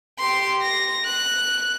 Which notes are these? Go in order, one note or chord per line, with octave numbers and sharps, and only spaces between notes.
G4 C6
A#6
F#6